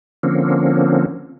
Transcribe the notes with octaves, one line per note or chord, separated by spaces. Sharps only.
D3 F3 A#3 C4 C#4